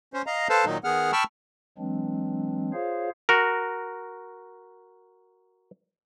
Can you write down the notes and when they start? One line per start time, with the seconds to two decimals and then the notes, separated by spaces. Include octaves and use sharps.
0.14 C#4 C5
0.27 D#5 F5 A#5
0.49 A4 B4 C5 F5 A5
0.65 A#2 D#3 F#3 D#4
0.84 D#3 B3 G#4 F#5 F6
1.12 G5 A5 B5 C#6 E6 F6
1.78 E3 F#3 G#3 C4 D4
2.73 F4 G#4 C5 C#5 F5
3.29 F#4 A#4